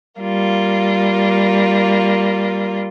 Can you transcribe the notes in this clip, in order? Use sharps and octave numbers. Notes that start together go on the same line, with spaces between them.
G3 A#3 F4